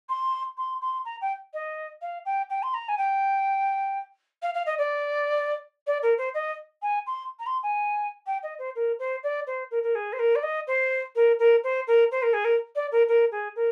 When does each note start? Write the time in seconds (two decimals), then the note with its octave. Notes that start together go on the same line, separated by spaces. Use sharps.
0.09 C6
0.57 C6
0.81 C6
1.05 A#5
1.21 G5
1.53 D#5
2.01 F5
2.25 G5
2.49 G5
2.62 C6
2.74 A#5
2.88 G#5
2.97 G5
4.42 F5
4.54 F5
4.66 D#5
4.78 D5
5.86 D5
6.02 A#4
6.17 C5
6.34 D#5
6.82 G#5
7.06 C6
7.39 A#5
7.46 C6
7.62 G#5
8.26 G5
8.42 D#5
8.58 C5
8.75 A#4
8.99 C5
9.23 D5
9.47 C5
9.71 A#4
9.83 A#4
9.95 G#4
10.12 C5
10.19 A#4
10.35 D5
10.43 D#5
10.67 C5
11.15 A#4
11.39 A#4
11.63 C5
11.87 A#4
12.11 C5
12.22 A#4
12.33 G#4
12.44 A#4
12.75 D5
12.91 A#4
13.08 A#4
13.31 G#4
13.55 A#4